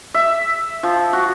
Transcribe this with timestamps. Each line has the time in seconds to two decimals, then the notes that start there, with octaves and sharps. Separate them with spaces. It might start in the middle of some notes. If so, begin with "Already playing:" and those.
0.14 E5
0.83 F3
1.13 F#4